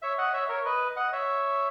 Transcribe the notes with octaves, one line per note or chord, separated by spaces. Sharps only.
C#5 E5
D#5 F#5
C#5 E5
A#4 C#5
B4 D#5
D#5 F#5
C#5 E5